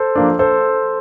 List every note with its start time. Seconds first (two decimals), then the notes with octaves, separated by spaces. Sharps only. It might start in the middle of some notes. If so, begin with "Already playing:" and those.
Already playing: A4 C5
0.16 F3 A#3 D4
0.39 A4 C5